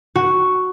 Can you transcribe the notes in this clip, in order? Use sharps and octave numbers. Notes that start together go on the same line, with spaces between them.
F#4